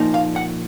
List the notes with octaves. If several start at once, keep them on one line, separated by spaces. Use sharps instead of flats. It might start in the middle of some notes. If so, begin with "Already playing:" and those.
Already playing: A#2 F3 A#3 D#4
F5
F#5